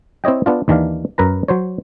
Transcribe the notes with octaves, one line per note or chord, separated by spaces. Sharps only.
C4 E4 C#5 D#5 G5
B3 D4 F4
D#2 D#3 E3 D4 F5
F#2 A#4 B4 A#5
F#3 C5 C#5